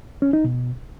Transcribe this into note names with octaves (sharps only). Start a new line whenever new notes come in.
C#4
D#4
B2